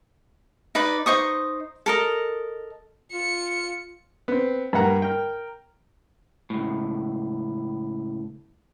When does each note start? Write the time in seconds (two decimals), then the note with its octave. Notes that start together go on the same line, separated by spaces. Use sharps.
0.75 D#4 B4 D5 B5
1.06 D#4 C5 C#6 D#6
1.86 A4 A#4 D#5
3.12 F4 C#7
4.28 B3 C4
4.73 G2 A#3 F#5 A#5
5.02 A#4 G5
6.50 C#2 A2